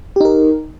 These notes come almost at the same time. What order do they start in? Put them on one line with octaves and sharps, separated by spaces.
G4 D#4 A#4